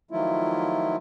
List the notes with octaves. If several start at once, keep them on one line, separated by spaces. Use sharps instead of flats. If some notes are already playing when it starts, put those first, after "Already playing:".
D#3 F3 F#3 A3 E4 F4